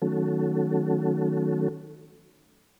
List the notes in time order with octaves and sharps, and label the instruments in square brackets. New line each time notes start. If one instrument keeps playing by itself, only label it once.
[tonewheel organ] D#3 F#3 A3 C#4 F#4 A4